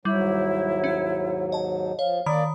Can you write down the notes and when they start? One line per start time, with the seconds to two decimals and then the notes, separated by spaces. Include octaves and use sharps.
0.05 D#2 G#2 F#3 G3 E4
0.84 C#4
1.52 D#5 A5
1.99 F3 C#5 F5
2.26 D#3 A#3 D5 B5